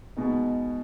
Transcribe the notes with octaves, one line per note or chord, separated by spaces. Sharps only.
B2 G#3 B3 D#4